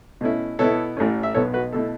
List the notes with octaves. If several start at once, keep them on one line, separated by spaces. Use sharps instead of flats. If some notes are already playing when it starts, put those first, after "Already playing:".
B2 A3 C#4 E4
B2 B3 E4 A4 C#5
A1 A2 A3 C#4
E5
B1 B2 B3 A4 C#5
F#4 B4
B2 A3 E4 A4